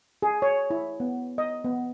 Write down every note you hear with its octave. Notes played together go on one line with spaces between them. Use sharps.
G#4
C#5
E4
B3
D#5
B3